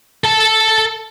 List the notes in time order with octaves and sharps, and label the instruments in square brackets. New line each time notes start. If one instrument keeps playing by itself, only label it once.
[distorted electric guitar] A4 A5